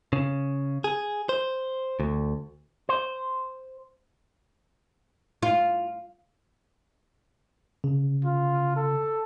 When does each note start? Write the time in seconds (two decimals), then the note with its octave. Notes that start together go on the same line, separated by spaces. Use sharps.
0.13 C#3
0.84 G#4
1.29 C5
2.00 D2
2.89 C5
5.43 F4
7.84 C#3
8.25 F4
8.76 A4